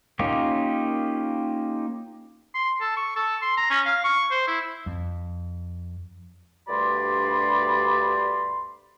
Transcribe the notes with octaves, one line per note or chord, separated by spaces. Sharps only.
A#3 C#4 D#4 F4 G4
C6
A4
C#6
A4
C6
A#5
C#4
F5
C#6
C5
E4
F2
D2 G2 G4 D5 B5 C6